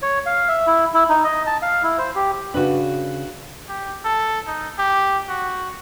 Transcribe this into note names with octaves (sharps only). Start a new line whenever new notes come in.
C#5
F5
E5
E4
E4
D#4
D#5
A5
F5
E4
C5
G4
C#3 D4 F#4 B4
G4
A4
D#4
G4
F#4